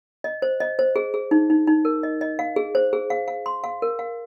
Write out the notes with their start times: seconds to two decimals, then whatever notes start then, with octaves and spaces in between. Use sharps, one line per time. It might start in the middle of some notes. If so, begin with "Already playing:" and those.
0.24 D#5
0.42 C5
0.60 D#5
0.79 C5
0.96 G#4
1.14 G#4
1.31 D#4
1.50 D#4
1.67 D#4
1.85 A#4
2.03 D#5
2.21 D#5
2.39 F5
2.56 G#4
2.75 C5
2.93 G#4
3.10 F5
3.28 F5
3.46 C6
3.64 F5
3.82 A#4
3.99 F5